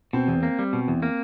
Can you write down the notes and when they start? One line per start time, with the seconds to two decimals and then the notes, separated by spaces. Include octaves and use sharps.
0.13 B2 C4
0.28 E2
0.43 A#3
0.59 G3
0.73 B2
0.88 E2
1.02 A#3